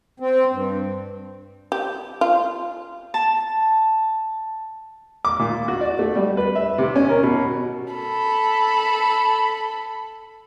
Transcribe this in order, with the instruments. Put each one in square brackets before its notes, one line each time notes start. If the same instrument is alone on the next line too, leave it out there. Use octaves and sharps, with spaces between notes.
[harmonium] C4
G2
[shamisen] G4
F4
[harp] A5
[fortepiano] D6
A#2
F#4
D5
A3
G3
B4
E5
C3
C#4
A#4
B2
[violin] A4 B5